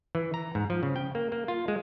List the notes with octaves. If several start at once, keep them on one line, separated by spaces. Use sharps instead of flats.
E3
A#5
G#2
F3
C#3
G5
A#3
A#3
F4
G#3